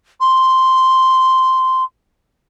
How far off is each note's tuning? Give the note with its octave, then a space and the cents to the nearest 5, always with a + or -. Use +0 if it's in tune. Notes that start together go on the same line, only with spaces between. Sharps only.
C6 -5